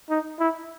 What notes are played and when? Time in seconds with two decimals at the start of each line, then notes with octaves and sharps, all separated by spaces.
0.10 D#4
0.39 E4